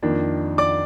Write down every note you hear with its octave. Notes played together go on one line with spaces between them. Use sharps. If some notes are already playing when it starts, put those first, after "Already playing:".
F2 D#3 A#3 D4
D5 D6